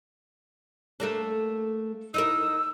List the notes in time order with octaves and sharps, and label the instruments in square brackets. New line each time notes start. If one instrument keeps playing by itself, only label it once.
[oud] A3 A#3 D4
[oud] D#4 E4 A#4 [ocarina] E6